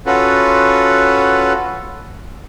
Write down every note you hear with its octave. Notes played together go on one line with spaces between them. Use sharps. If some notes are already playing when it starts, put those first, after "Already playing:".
C#4 F4 F#4 A4 B4